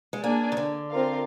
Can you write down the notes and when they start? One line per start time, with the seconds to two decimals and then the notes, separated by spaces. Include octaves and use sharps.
0.13 G#3
0.23 A#3 D4 G#4 D5 G#5
0.52 D#3
0.57 D3
0.91 C4 F4 A#4 F5